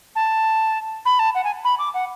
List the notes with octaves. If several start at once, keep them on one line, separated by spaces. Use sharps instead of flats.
A5
B5
A5
F#5
G#5
B5
D6
F#5